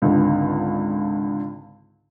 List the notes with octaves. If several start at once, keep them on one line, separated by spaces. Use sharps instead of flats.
G#1 C#2 D3